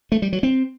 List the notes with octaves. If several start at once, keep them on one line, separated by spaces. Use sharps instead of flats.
A3
G3
F#3
C4